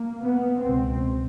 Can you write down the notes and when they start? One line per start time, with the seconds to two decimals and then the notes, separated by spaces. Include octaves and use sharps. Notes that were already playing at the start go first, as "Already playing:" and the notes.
Already playing: A#3
0.20 B3
0.62 C#2 B2 C4